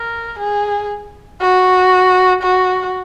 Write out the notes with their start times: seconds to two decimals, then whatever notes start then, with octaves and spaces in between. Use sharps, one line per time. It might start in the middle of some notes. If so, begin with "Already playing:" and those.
Already playing: A#4
0.39 G#4
1.41 F#4
2.43 F#4